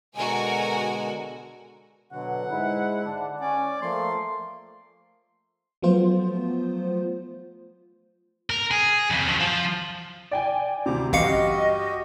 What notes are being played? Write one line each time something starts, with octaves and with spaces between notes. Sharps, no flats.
B2 D3 G#3 F#4 A#4 G#5
B2 D3 F#3 F#5
G#2 G#3 E4
D3 D4
C#4 D5 G#5
F3 A3 A#3 C6
F3 F#3 A3 B3 F4 C5
A#4
G#4
F2 C#3
F3 F#3
F3
D5 G5 G#5
D2 C3 C5 A#5 D6
A1 G2 F#4 G4 D#5 F5 C#7